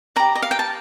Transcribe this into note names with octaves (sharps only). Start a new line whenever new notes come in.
G4 D5 A#5
D#5
F5
G5
A5